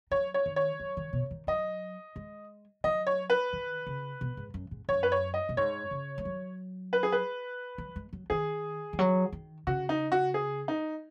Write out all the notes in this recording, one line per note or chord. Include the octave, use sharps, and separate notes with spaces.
F#3 C#5
C#5
D#3
C#5
F#3
D#3
B2
D#3
F#3 D#5
G#3
F#3 D#5
C#5
B4
D#3
C#3
B2
G#2
F#2
G#2
F#2 C#5
B4
C#5
D#5
B2
G#2 C#5
C#3
G#3
F#3
B4
G#4
B4
F#3
G#3
F#3
D#3 G#4
D#3
F#3
D#3
C#3 F#4
D#4
F#4
G#4
D#4